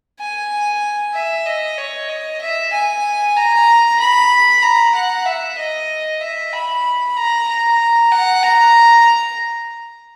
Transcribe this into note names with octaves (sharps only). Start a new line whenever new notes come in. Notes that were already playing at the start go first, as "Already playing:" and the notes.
G#5
E5
D#5
C#5
D#5
E5
G#5
A#5
B5
A#5
F#5
E5
D#5
E5
B5
A#5
A#5
F#5
A#5